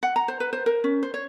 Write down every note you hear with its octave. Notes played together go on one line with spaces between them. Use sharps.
F#5
A#5
C5
B4
C5
A#4
C#4
C5
C#5